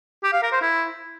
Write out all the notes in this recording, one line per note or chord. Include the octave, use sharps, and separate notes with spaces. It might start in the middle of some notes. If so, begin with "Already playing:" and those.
G4
F5
A#4
C5
E4